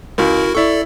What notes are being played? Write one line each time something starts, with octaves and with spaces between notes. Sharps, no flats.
C#2 E4 F#4 A#4
E4 A4 D5 C#6